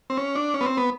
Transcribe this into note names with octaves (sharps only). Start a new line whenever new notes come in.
C4
C#4
D4
C#4
B3
C4
B3